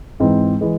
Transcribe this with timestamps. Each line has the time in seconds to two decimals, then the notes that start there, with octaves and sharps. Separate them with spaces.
0.20 G#2 E3 G#3 C4
0.61 E3 G#3